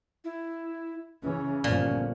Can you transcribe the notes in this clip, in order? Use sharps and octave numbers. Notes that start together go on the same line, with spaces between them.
E4
C#3 E3 C#4
G1 G2 A#2 F3